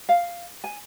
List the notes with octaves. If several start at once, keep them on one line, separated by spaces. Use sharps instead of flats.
F5
G#5